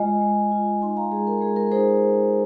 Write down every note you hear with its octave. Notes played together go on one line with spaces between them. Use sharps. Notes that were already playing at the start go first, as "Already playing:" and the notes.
Already playing: G#3 F4 D#5 G#5
G#3
F4
D#4 G#5 C6
F5 A#5
G#3 G#4
A#4
G#3 G#4
A#4
D#4 G#4 C5